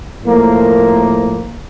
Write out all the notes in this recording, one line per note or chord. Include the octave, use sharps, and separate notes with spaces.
A2 F3 A#3